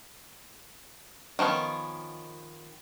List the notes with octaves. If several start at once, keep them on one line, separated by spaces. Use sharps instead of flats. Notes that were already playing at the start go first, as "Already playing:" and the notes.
D#3 F3 B3 C#4